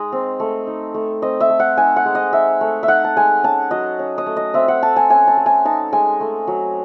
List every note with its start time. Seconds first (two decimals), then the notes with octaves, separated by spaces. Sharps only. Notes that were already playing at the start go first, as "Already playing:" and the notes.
Already playing: G#3 D#4 D#5
0.12 C4
0.40 A3
0.67 D#4
0.94 A3
1.22 C4 D#5
1.41 E5
1.50 A3
1.60 F#5
1.77 D#4 G#5
1.96 F#5
2.05 G#3
2.15 D#5
2.32 D#4 E5
2.61 A3
2.83 E5
2.88 D#4 F#5
3.04 A5
3.17 G#3 G#5
3.43 C#4 A5
3.71 F#3 D#5
3.99 C#4
4.18 D#5
4.26 A3
4.36 D#5
4.54 C4 E5
4.68 F#5
4.82 A3 A5
4.96 G#5
5.10 C#4 G#5
5.27 A5
5.37 A3
5.46 G#5
5.65 D#4 A5
5.93 G#3 G#5
6.20 A3
6.48 F#3